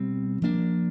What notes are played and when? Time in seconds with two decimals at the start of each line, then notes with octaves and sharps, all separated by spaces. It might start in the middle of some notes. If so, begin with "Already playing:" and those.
Already playing: B2 G3 C4
0.42 F3 A#3 D4